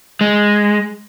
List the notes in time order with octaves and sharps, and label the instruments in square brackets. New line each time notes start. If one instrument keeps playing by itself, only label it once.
[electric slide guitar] G#3